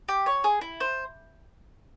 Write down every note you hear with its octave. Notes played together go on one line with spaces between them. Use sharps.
G4
C#5
G#4
E4
C5